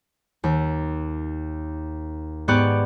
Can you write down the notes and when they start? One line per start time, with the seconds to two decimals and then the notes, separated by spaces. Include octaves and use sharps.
0.44 D#2
2.48 G#2 B3 G4 D5 C#6 F#6